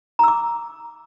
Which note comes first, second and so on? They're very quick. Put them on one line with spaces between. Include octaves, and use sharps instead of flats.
A#5 E6 D6